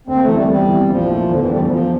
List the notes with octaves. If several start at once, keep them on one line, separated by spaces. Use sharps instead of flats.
D2 C4
A#3
A3
C3 E3
G3
E2 G3
C3 E3
A#1 F3
A#2 A3 E4
E2 D3
E3
D3 G3 A3 D4 A4
F3
E2 F3